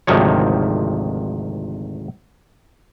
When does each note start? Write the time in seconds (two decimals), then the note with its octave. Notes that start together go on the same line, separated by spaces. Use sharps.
0.07 G#1 D2 C3 D#3 F3 C#5